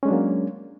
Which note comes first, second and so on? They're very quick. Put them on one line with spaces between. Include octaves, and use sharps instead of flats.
C#4 G#3 D4 F#3 A#3